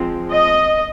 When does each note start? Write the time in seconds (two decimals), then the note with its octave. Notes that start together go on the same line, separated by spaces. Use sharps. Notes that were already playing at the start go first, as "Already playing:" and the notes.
Already playing: F3 G#3 C4
0.32 D#5